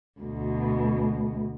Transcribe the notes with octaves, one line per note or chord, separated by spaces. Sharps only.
D2 B2